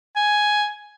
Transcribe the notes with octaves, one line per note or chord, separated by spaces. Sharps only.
G#5